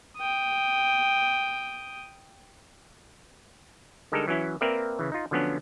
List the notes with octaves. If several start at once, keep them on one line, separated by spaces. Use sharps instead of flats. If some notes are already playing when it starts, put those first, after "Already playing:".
G5 D#6
D3 G3 G#3 D#4 A4 A#4
E3 F#3 C#4 E4
A#3 C4 A#4 B4 D5 E5
C#3 E3
D#4 F4
D3 F3 F#3 B3 C#4 D4